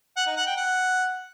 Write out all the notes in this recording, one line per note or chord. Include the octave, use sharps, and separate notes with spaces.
F#5
D#4
F#5
G5
F#5